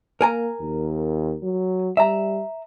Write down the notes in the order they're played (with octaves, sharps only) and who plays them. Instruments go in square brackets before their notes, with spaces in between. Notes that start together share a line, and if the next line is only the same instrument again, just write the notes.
[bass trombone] A#3 [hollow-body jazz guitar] A#4 G#5 A#5
[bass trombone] D#2
F#3
[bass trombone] G3 [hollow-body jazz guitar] E5 A#5